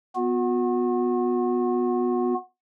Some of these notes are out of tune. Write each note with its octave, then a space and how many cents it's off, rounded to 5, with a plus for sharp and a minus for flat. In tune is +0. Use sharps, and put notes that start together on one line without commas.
B3 +0 F#4 -40